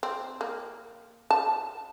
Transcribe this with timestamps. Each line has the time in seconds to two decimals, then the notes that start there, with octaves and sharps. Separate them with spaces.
0.03 C4
0.41 A#3
1.30 A5